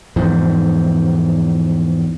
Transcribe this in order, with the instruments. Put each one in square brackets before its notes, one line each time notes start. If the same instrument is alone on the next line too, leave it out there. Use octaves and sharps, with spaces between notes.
[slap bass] E2 G#2 F3